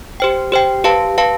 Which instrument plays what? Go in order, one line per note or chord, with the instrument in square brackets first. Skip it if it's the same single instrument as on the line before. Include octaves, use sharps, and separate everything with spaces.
[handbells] G4 C5 G5
G4 C5 G5
G4 B4 F5 A5
G4 B4 F5 A5